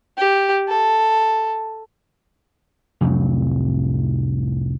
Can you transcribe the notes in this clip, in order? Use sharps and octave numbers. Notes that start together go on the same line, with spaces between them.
G4
A4
C2 F2 A2 F#3